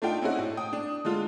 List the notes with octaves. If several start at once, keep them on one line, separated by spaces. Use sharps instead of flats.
A3 D4 D#4 F4 G5
C4 C#4 D#4 E4 F#4
A2
G5 D#6
D4
D3 G#3 F4